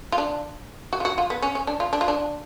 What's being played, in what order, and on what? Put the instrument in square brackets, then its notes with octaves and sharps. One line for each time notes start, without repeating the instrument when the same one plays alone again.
[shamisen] F4
D4
F#4
F4
F#4
F4
B3
C#4
C#4
D4
F4
D4
F4
D4